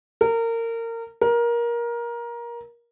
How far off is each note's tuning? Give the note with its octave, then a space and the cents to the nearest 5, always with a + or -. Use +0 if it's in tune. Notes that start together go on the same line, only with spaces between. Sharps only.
A#4 -25
A#4 +20